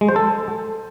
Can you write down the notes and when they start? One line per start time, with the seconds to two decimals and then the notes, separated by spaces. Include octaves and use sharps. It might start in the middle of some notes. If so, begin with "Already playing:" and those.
0.01 G#3
0.09 C5
0.16 A4